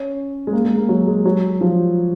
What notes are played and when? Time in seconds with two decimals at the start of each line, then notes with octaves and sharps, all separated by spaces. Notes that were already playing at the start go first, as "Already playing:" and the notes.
Already playing: C#4
0.47 G#3
0.53 A#3
0.65 G#3
0.77 A#3
0.89 F#3
1.07 G#3
1.25 F#3
1.61 F3